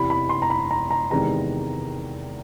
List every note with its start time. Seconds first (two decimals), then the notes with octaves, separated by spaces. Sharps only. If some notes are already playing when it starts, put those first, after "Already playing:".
Already playing: E2 C3 E3 B5
0.10 B5
0.29 C6
0.42 A#5
0.50 B5
0.71 A#5
0.91 A#5
1.10 E2 C3 D#3 G#3 B3 A#5